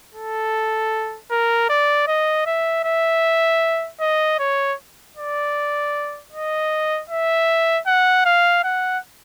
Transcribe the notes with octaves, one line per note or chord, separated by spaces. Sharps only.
A4
A#4
D5
D#5
E5
E5
D#5
C#5
D5
D#5
E5
F#5
F5
F#5